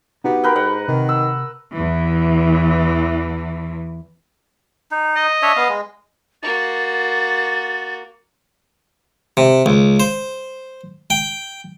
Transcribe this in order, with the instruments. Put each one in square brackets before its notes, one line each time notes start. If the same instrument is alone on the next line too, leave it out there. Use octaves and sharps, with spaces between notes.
[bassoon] B3 [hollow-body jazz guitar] D#4 F#4 G4
[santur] A#4 B4 G5
[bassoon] G#2 [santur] F#5
[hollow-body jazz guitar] C3 [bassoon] D#3
[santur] E6
[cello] E2 E3
[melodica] D#4
[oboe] D#5
[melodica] D4 C#5 E5
B3 F5
G#3
[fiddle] A#3 F#4 [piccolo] A6
[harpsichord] C3
C#2
C5
G5